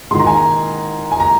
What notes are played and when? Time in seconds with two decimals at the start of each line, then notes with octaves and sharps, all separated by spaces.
0.11 G#2 C6
0.15 D#3 A#5
0.27 G#5
0.36 A#5
1.12 G#5
1.20 A#5